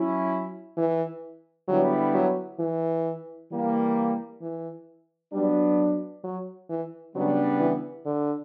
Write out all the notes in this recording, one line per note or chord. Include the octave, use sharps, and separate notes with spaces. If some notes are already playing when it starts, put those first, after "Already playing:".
Already playing: F#3 C#4 E4
E3
D3 F#3 G3 B3 E4
F#3
E3
E3 G3 A#3
E3
F#3 G3 B3 D4
F#3
E3
C#3 F#3 G3 B3 D4
E3
D3